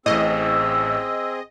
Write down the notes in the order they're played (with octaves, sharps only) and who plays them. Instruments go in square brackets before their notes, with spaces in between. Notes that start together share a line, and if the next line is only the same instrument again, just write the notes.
[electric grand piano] A1 A2 [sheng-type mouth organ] C4 G#4 [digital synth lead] D#5 [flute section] E6